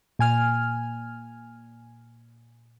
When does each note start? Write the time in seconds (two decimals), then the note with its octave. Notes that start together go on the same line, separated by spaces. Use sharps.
0.19 A#2 G#5 F6